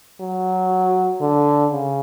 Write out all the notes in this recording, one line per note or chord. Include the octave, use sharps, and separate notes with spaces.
F#3
D3
C#3